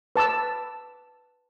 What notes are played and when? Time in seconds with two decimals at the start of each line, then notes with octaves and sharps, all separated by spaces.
0.16 B4 A5 D6 E6